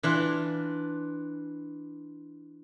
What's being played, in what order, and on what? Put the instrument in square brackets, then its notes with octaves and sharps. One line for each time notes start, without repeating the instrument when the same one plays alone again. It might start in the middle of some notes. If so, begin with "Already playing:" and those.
[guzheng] E3 D4 F4